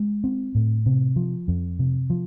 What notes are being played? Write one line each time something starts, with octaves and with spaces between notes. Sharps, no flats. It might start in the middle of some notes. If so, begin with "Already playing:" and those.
Already playing: G#3
C4
A2
C3
F3
F2
C3
F3